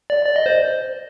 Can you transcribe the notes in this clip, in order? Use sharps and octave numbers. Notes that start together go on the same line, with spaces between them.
D5
D5
D#5
C5